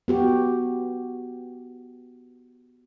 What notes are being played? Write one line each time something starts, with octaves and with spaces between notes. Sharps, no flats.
B3 F#4 G4